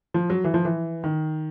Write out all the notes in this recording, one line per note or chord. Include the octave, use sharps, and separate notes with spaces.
F3
F#3
E3
F3
E3
D#3